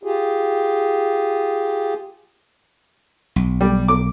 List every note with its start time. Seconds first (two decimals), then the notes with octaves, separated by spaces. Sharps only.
0.03 F4 G4 G#4
3.36 B1
3.61 G3
3.88 D6